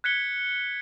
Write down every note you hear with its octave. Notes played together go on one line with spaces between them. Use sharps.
F#6 G#6 B6 C#7 G7